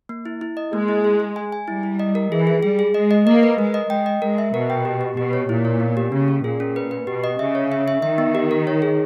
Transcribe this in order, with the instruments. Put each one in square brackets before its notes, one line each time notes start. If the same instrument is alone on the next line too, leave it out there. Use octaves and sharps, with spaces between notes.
[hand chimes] A#3
E4
E4
D#5
[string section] G#3 [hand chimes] A#3
[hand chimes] E4
G#4
G#4
G#5
G#5
[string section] G3 [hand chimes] E4
[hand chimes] E4
D#5
A#4
[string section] E3 [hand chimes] G#4
[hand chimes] G#4
[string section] G3 [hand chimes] G#4
[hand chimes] G#4
[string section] G#3 [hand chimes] D#5
[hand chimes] D#5
[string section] A#3 [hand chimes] D#5
[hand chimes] B4
[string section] G#3 [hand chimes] A#4
[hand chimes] D#5
[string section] G#3 [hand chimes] G5
[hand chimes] D#5
[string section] G#3 [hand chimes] A#4
[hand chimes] E5
[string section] B2 [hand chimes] A#4
[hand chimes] G5
G4
G4
[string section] B2 [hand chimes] G4
[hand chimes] C#5
[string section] A#2 [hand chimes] E4
[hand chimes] C#5
B3
G4
[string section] C#3 [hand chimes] A#3
[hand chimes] C#4
[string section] A#2 [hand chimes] G#4
[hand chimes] C#4
B4
B4
[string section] B2 [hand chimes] G4
[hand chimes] D#5
[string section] C#3 [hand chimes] E5
[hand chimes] C#5
E5
E5
[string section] D#3 [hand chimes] E5
[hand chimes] B3
G4
A#4
C#5
G#4